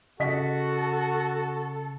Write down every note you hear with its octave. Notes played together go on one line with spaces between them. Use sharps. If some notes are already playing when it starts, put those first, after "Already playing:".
C#3 F#4 A4 D#5 B6